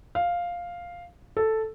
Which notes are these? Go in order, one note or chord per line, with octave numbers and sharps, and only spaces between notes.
F5
A4